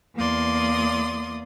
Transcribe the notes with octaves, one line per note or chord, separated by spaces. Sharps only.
E2 A#3 D5 C6 D#6